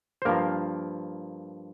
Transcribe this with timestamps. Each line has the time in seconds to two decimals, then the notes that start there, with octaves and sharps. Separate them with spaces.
0.22 C5
0.25 G2 F3 A#3 A#4